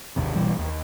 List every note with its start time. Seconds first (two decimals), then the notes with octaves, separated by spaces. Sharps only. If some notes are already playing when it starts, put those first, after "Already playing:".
0.16 G#1 D#2 C3
0.36 B1 E3 G3
0.59 D#2